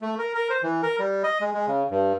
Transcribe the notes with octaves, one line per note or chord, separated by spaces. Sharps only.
A3
A#4
A#4
C5
E3
A#4
G3
D#5
G#3
G#3
C#3
G2